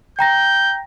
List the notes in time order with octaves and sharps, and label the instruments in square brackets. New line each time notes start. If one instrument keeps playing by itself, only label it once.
[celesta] G5 A#5 A#6 [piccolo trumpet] G6